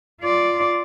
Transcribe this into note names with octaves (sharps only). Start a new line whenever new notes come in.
F4 D5